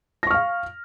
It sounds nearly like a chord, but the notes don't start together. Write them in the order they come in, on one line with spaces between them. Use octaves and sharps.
A#6 C#6 F6 F5